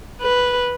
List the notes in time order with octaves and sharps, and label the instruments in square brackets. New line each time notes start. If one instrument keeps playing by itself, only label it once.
[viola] B4